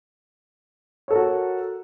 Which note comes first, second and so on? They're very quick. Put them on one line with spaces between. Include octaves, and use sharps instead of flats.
C#5 A4 A#4 F#4